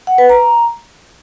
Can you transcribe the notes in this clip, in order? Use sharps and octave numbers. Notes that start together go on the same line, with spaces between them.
F#5
B4
A#5